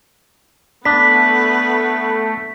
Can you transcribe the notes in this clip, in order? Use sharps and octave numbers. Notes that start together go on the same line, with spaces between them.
A3 B3 D4 B4 B6